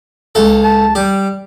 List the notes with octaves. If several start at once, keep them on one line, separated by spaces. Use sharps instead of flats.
C#2 A4
A5
G3 G4